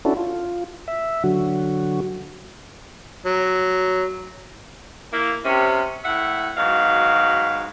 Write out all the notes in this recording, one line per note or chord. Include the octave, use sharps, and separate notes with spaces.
C#4 D4 E4 F#4 A4
F4
E5
D3 F#3 F#4
F#3
A#3 E4
C3 C#4
A2 E5 F#5
G#2 B2 F#3 F5